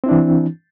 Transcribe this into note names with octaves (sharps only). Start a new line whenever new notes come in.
E3 C4 D4 E4